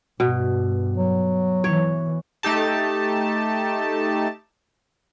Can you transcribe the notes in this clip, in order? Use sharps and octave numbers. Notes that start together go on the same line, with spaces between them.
G2 B2
F#3
E3 C#5
A3 D#4 G4 A5